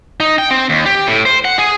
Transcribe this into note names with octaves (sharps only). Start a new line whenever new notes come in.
D#4
G5
C4
D#2
G4
A2
C5
F#5
G#4